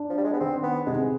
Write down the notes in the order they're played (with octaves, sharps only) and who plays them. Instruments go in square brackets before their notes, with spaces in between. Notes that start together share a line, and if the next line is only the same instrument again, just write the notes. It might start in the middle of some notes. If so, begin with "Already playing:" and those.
Already playing: [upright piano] D4
[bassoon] F3
G3
G#3
B3
[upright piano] D#3 [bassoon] C4
[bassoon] B3
[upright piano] C3 [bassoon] G#3